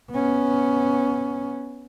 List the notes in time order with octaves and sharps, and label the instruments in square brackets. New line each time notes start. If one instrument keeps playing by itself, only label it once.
[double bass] B3 C#4